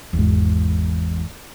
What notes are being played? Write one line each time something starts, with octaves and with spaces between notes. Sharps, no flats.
G#1 E2